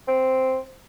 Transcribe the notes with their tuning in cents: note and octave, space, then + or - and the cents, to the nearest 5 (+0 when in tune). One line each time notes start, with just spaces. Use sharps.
C4 -5